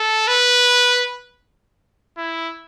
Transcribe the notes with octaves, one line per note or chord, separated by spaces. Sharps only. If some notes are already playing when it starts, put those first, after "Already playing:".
Already playing: A4
B4
E4